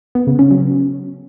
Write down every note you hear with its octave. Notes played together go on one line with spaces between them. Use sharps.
B3
C#3
C#4
F#3